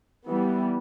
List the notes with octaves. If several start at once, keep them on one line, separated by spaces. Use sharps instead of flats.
E3 G3 B3